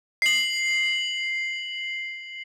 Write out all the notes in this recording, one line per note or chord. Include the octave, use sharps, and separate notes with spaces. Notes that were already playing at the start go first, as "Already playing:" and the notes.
C7 F#7